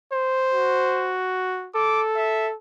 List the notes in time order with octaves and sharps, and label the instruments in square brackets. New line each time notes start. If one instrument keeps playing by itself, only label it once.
[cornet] C5
[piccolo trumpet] F#4
[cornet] A4 [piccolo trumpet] D6
[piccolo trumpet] E5